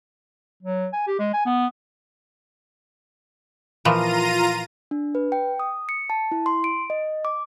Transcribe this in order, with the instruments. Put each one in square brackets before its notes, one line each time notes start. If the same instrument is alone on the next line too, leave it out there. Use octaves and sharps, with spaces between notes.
[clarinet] F#3
G#5
G4
G#3
G#5
B3
[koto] A#2 E3 F3 [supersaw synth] F4 A#5 D#7
[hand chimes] D4
B4
G5
D#6
C#7
A5
E4
C6
D7
D#5
D6